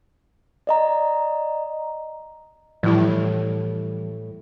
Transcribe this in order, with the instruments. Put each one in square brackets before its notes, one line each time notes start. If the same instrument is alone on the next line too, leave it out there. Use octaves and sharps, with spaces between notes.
[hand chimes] D5 D#5 A#5
[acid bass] A2 [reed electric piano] E3 G3 [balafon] F3 E4